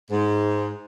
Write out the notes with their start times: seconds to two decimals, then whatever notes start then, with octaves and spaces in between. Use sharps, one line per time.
0.11 G#2